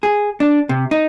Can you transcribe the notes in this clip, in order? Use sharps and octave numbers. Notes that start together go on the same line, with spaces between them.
G#4
D4
C3
D#4